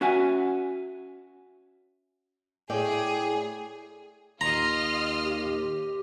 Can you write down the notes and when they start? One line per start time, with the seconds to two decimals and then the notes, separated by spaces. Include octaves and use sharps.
0.01 C#4 F#4 E5 F#5 G#5
2.70 A2 G#4 D5 G5
4.41 D#2 F4 D#5 A#5 C6 F6
5.25 G4